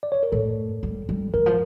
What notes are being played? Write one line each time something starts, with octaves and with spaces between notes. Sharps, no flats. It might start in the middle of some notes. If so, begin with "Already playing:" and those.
D5
C#5
A#4
A2 A4
G3
G3
E3 A#4
F3